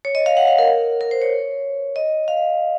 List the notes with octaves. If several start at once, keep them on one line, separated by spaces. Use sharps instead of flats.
C#5
D#5
F5
F#5
F5
A#4
A#4
C5
C#5
D#5
F5